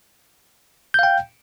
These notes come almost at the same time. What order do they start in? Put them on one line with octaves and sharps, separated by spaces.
G6 F5 G5